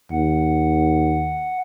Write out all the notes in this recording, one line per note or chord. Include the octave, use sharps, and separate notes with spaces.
D#2 F#5